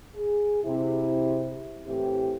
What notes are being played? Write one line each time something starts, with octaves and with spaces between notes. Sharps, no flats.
G#4
C3 E4
A2 E3 C4 E4 G4